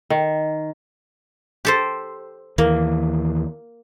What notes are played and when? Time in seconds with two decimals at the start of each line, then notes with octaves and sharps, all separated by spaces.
0.10 D#3
1.65 G4 A4 C5
2.58 D#2 E3 A#3